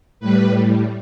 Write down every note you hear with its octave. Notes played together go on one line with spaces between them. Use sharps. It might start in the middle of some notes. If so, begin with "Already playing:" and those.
A2 G3 B4